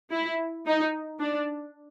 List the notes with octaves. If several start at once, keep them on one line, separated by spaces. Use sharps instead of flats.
E4
D#4
D4